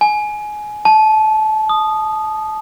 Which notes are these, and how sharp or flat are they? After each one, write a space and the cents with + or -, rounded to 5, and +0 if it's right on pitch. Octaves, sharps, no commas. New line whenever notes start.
G#5 +20
A5 -25
D#6 -10